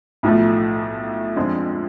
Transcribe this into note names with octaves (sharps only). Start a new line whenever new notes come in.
B1 A2 F3 A3
F2 D3 F3 G#3 C4